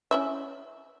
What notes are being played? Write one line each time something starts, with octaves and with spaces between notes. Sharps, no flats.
C#4 E4 E5